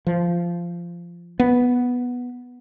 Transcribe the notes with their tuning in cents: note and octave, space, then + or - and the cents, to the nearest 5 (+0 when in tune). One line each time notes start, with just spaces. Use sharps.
F3 -15
B3 -5